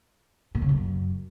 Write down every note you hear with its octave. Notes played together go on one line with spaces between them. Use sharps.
A#2
C#3
F#2